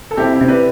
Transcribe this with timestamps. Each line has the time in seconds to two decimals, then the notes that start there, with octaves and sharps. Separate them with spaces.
0.11 A4
0.17 C3 E4 G4
0.33 E4
0.41 C3
0.48 B4 D5